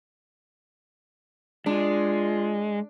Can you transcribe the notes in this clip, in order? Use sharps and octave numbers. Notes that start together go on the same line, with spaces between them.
G#3 D4 F4